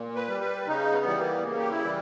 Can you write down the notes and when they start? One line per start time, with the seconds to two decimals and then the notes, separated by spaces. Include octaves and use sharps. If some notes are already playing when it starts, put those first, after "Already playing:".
Already playing: A#2
0.16 B4
0.28 G3
0.41 B4
0.67 C#3 D#4
0.92 B3
1.05 E3 G3
1.18 A#3
1.37 B3
1.43 C#3 A#3
1.58 G4
1.69 E4
1.82 E3 G3